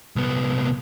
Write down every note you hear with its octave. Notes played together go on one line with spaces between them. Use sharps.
C2 B3